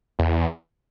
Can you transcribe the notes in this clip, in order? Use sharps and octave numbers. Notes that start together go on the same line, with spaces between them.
E2